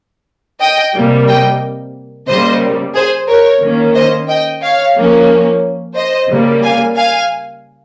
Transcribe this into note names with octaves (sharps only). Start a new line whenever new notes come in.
D#5 G5
C3 G3 A#3
D#5 G5
C#3 G3 A#3 C5 D#5
G#4 C5
A#4 C#5
D#3 A#3 C#4
C5 D#5
D#5 G5
C#5 F5
F3 A#3 C#4
C5 D#5
C#3 G3 A#3
F5 G#5
F5 G#5